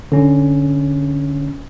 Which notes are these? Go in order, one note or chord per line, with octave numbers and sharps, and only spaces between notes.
D3 C#4